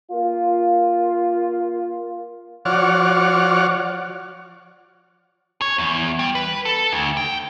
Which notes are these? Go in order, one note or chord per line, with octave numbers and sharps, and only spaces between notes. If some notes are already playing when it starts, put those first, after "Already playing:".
A#3 F4
F3 F#4 C#5 D5 F#5 F6
C#5
E2
G3
B4
A4
D2
G5